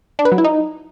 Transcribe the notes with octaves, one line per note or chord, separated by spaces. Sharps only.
D4
B4
F#3
E4
D#4